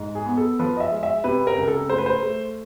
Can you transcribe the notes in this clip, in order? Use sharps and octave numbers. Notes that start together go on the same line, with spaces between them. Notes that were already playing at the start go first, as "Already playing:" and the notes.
Already playing: G#2
G#4
B3
A4
F3 B4
D#5
E5
G#3
E5
C3 B4
A#4
C#2
A4
A3 C5
B4
C5
A3